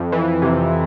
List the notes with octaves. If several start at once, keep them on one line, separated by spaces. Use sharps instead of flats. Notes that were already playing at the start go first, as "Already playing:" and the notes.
Already playing: F2
E3
C3